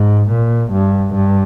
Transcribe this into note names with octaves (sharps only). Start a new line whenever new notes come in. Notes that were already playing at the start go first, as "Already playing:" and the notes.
Already playing: G#2
A#2
G2
G2